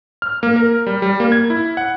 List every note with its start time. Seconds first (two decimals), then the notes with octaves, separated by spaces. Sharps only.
0.22 F6
0.43 A#3
0.56 A#4
0.87 G3
1.02 G3
1.20 A#3
1.32 G#6
1.50 E4
1.77 F#5